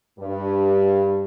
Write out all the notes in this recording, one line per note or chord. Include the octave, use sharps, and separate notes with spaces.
G2